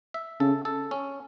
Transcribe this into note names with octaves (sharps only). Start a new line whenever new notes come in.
E5
C#3 A4
A4
C#4